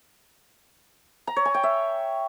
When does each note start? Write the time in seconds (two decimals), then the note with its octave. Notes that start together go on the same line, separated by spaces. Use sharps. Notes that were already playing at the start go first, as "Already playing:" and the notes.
1.27 A#5
1.36 C#5
1.45 G#5
1.54 G5
1.63 E5